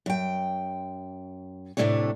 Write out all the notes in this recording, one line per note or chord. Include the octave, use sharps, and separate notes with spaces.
F#2 G5
A2 C3 E3 A3 D4 C#5